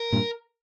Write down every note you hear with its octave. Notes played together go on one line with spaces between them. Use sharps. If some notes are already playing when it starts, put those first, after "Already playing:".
Already playing: A#4
G2 A#2